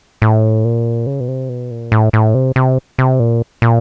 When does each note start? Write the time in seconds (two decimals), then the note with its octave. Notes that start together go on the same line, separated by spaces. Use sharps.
0.22 A2
0.65 A#2
1.07 C#3
1.20 B2
1.28 C3
1.49 B2
1.71 A#2
1.92 A2
2.13 A2
2.34 C3
2.56 C3
2.98 C3
3.20 A#2
3.62 A#2